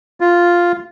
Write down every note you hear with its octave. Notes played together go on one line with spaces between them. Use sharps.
F4